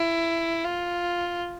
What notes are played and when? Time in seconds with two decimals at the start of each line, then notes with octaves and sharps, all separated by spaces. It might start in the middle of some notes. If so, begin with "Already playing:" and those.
Already playing: E4
0.64 F4